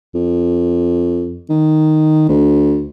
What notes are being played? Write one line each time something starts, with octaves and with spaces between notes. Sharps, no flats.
F2
D#3
D2